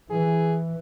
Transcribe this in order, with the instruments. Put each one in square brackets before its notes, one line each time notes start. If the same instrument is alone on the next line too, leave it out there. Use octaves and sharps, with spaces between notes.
[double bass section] E3 [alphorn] G#4